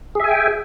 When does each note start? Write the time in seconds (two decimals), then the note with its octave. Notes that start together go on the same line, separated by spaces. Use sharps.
0.15 G#4
0.20 E5
0.24 G#5
0.28 G5